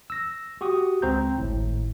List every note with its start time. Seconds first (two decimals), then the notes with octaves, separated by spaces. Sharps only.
0.10 E6 A#6
0.61 F#4 G4 C#6 D#6
1.02 C#2 C4 C5 A#5 G6
1.38 G#1 A2